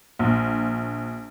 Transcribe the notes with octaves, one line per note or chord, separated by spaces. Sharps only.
A#1